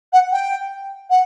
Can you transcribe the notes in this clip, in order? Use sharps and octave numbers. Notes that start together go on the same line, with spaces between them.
F#5
G5
F#5